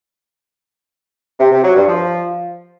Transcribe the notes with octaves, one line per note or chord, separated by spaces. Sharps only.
C3
C3
F#3
G2
F3